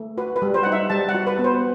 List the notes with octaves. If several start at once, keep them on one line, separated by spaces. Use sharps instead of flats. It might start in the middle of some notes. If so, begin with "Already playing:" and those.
Already playing: A3
F#4 B4
B4
G3
C5
D#4 F#5
E5
G3 A5
F#5
F#4
B4
B3
C5